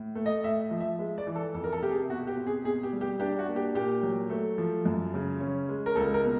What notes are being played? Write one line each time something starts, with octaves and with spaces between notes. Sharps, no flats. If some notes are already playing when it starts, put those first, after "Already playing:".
Already playing: A2
A3
D#5
A2 E5
F3
E5
G#3
D5
E3
A4
F2 A4
A#4
A4
C3 G4
G#4
B2 F#4
G4
C4
G#4
B2 G#4
G4
G3
G4
D4 G4
F#4
A#3
G4
A#2 G4
F#3
A3
F3
F#2
C#3
C#4
G#3
A#4
C#2 A4
A#4
B2